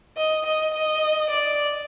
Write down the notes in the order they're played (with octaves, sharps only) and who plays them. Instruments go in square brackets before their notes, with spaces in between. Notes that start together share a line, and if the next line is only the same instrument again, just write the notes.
[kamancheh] D#5
D#5
D#5
D5